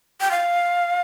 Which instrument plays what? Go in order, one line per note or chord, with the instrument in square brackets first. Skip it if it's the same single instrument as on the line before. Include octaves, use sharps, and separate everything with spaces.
[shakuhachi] G5
F5